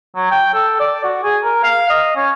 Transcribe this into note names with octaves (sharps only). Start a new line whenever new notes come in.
F#3
G5
A4
D5
F#4
G#4
A#4
F5
D#5
C#4